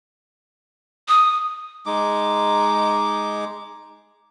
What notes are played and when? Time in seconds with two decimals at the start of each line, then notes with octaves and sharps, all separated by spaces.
1.09 D#6
1.86 G#3 D#4 D6